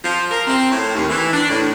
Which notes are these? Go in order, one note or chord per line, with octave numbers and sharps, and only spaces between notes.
F3
A#4
C4
A2
D#2
E3
D4
A2